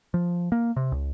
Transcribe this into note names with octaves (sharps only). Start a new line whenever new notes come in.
F3
A#3
C3
C#2